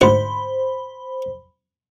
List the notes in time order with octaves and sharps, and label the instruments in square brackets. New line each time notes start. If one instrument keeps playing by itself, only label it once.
[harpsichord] D2 G#2 F#5 [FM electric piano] C5 B5